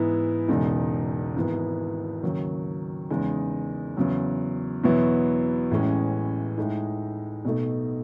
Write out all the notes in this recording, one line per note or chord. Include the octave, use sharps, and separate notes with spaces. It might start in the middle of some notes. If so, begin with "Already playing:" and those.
Already playing: G#2 E3 B3 E4
E1 E2 C#3 G#3 D#4
G#1 G#2 E3 B3
D#2 C#3 F#3
E2 C#3 G#3 D#4
E2 C#3 F#3
E2 B2 F#3 B3 E4
A1 A2 E3 G#3 C#4
A2 G#3 D#4
B1 B2 A3 D#4